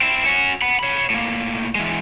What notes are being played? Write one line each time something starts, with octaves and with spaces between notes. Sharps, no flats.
C4 E4
C#4 F#4
F#5 B5
C#5 B5
A2 A#3
E3 G#3